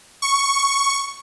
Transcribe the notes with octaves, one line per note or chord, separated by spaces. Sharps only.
C#6